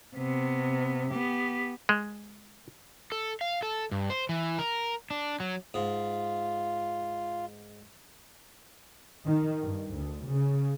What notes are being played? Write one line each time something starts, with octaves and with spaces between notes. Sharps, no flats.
C3 B3
B3 G4
G#3
A4
F5
A4
G2
C5
E3
A#4
D4
F#3
G#2 F4
D#3
G2
D2
C#3